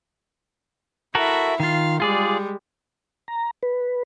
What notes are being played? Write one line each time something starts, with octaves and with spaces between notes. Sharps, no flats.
E4 F#4 A4 A#4 E5
D#3 F4 F5
G3 G#3 F4 G#4 D5
A#5
B4